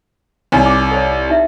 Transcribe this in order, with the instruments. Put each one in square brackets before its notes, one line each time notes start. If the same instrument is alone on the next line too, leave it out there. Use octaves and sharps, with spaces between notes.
[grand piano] C2 [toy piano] D#4 C#5 G#5
[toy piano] D6
A4 C5 C#5
D#4 E5